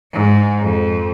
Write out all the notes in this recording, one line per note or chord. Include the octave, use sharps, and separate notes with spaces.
G#2
F2